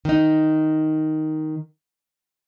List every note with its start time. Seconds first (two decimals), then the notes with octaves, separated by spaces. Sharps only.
0.05 D#3 D#4